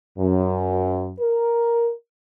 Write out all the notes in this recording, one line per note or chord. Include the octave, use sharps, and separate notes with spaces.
F#2
A#4